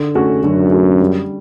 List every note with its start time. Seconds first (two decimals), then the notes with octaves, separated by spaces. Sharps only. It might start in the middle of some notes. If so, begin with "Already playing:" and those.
Already playing: D3
0.15 A3 C#4 F#4
0.43 F#2 D3
0.72 A3 C#4 F#4
1.00 G3